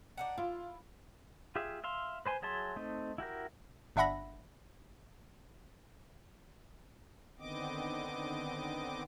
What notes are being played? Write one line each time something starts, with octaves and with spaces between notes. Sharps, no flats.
D4 D#4 F#5
E4 F4
F4 G4 G#4 E5
E5 F5 C6
B4 C5 G#5 C6
F#3 G#4 E5 A5 C6
A3 C4 D#4
E4 F#4 G4 A#4
G1 D4 E5 F#5 B5 A#6
D3 D#3 B3 C4 D#5 D6